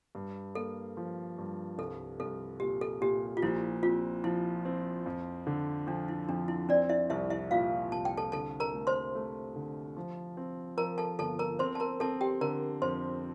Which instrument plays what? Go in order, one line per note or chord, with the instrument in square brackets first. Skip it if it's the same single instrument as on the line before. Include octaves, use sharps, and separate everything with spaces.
[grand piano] G2
[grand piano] A#3 [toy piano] A4
[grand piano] F3
G2
[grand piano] C2 [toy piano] A4
[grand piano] C2 [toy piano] A4
[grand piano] A#2 [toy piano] G4
[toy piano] A4
[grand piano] A#2 [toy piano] G4
[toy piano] F4
[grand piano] A#1 [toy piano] E4
[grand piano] C4 [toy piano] F4
[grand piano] F3 [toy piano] E4
[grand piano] C4
F2
D3
[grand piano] F3 [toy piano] D4
[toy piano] E4
[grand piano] F2 [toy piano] D4
[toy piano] E4
[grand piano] C4 [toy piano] D4 D5
[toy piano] E4 E5
[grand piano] C2 [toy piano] E4 E5
[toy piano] E4 E5
[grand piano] A#2 [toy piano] F4 F5
[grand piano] C2 [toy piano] A5
[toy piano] G5
A4 A5
[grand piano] D3 [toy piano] A4 A5
[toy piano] A#4 A#5
[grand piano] A3
[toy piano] C5 C6
[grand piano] A3
D3
F3
C4
[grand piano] F3 [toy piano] A#4 A#5
[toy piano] A4 A5
[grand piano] G1 [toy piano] A4 A5
[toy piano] A#4 A#5
[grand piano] C4 [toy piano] C5 C6
[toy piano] A5
A#4 A#5
[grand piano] C4 [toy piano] A4 A5
[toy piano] G4 G5
[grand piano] D3 [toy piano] A#4 A#5
[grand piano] F2 [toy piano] C5 C6